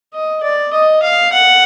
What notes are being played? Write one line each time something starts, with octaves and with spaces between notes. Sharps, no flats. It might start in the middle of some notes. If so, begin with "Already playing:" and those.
D#5
D5
D#5
F5
F#5